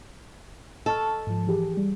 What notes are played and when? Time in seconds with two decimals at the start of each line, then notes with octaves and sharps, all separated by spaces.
0.86 A4 D#5 C#6 F6
1.27 G#2 F3
1.47 E3 G4 G#4
1.77 G3